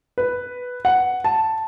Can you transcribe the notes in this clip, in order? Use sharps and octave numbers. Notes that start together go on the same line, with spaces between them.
B4
F#5
A5